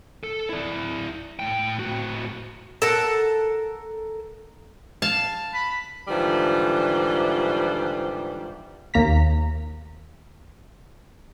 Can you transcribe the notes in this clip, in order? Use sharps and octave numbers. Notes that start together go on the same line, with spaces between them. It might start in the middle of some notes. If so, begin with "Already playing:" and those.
A4
E4 D5
A2 G5
A2 F#4
A4 A#4 F#5
F5 A5
B5
G#2 D3 E3 F3 G3
D#2 A#3 A#5 B6